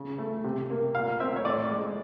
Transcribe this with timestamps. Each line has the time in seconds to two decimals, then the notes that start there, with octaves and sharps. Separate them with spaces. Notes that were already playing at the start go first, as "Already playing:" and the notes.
Already playing: C#3
0.18 A3
0.44 C3
0.70 A#3
0.95 A#2 F5
1.20 C4 E5
1.36 C#5
1.45 A2 D5
1.71 G#3